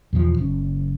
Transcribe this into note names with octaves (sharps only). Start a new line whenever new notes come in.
E2 B2 E3 F3
F#1 C#4